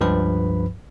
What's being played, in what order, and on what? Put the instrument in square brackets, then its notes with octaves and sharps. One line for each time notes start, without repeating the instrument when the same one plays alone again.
[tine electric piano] C#2 G2 F3 B4 B5